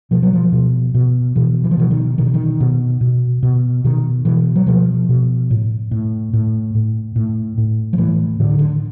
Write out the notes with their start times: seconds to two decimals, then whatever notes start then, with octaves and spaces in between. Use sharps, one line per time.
0.11 B2 F3
0.23 F#3
0.33 F3
0.52 B2
0.94 B2
1.36 B2 E3
1.64 E3
1.71 F3
1.77 B2 E3
1.91 D#3
2.18 B2 D#3
2.26 D3
2.34 D#3
2.60 B2
3.01 B2
3.43 B2
3.84 B2 D#3
4.25 B2 E3
4.56 F#3
4.67 B2 F3
5.09 B2
5.51 A2
5.91 A2
6.33 A2
6.75 A2
7.16 A2
7.58 A2
7.93 F3
7.98 A2 E3
8.40 A2 D3
8.49 D#3
8.59 D3